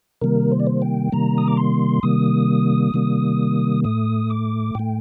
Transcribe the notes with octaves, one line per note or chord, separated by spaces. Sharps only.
C3 D#3 G3 A#3 A#4
C5
D5
C5
G5
C3 D#3 G3 A#3 A#5
D#6
D6
C6
C3 D#3 G3 A#3 D#6
C3 D#3 G3 A#3
A2 A3 D#6
D6
A2 A3 G5